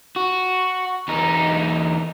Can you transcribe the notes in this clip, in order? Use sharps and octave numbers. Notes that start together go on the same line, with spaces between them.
F#4
E2 D#4